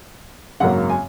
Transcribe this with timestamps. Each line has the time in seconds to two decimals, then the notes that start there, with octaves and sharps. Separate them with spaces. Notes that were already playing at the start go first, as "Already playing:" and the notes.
0.60 G#1 F#2 C#3 F#3 A#3 F#5
0.90 G#5